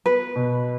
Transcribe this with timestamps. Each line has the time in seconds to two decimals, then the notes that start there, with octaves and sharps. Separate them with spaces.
0.06 B3 B4
0.36 B2